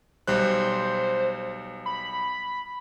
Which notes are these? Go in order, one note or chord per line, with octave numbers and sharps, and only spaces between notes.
B1 G3 C5 F#6
B5